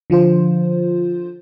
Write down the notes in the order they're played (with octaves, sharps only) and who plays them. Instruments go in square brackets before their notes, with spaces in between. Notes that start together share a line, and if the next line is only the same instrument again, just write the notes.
[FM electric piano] D3 F3 F4 C5